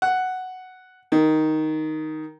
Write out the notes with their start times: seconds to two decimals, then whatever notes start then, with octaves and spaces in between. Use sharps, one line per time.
0.02 F#5
1.12 D#3